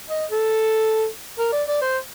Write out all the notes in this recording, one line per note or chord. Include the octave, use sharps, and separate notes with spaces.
D#5
A4
A#4
D5
D5
C5